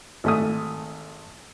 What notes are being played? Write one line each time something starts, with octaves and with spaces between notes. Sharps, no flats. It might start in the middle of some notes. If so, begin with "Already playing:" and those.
G#1 A3 D#6